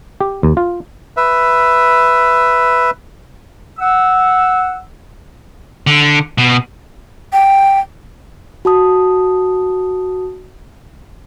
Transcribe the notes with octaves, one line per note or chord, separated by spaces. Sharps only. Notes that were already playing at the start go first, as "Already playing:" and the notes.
G4
D#2
F4
B4 E5
F#5 E6
D3
B2
G5
F#4 A5 D#6